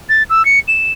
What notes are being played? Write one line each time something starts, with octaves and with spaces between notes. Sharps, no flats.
A6
E6
C#7
E7